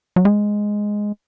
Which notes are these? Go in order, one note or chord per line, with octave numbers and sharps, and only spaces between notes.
F#3
G#3